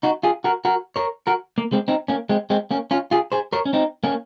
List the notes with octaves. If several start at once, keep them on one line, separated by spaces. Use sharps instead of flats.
D#4 F#4
F4 G#4
F#4 A#4
F#4 A#4
A#4 C#5
F#4 A#4
A#3
G#3 C4
C4 D#4
A#3 C#4
G#3 C4
G#3 C4
A#3 C#4
C#4 F4
F4 G#4
G#4 C5
A#4 C#5
C#4
C4 D#4
A#3 C#4